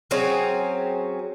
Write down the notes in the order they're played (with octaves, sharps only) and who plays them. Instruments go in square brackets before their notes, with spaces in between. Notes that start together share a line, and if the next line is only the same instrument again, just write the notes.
[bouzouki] F#3 C4 C#4 G#4